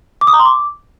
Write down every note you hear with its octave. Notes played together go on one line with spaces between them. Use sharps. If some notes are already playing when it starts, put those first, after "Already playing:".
D6
D#6
A#5
C6
D6